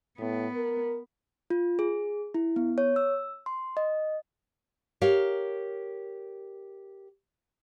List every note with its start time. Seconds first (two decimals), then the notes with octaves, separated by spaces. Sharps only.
0.19 A2 B3
0.54 A#4
1.50 F4
1.79 G#4
2.34 E4
2.56 B3
2.78 C#5
2.96 E6
3.46 C6
3.77 D#5
5.01 G4 A#4 C#5 F5